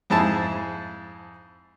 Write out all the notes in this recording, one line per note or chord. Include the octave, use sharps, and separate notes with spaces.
F2 G#2 E4 G#4 A5